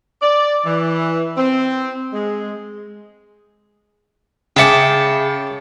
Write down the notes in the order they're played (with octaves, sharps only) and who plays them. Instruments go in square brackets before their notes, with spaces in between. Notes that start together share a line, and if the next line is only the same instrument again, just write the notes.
[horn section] D5
E3
C4
G#3
[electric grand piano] C#3 C#7 [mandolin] G#4 E5 D#6 [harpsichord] G5 A5 D6